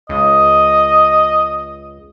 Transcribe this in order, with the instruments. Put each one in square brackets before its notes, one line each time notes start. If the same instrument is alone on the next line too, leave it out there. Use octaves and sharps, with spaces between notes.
[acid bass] C#2 [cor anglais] D#5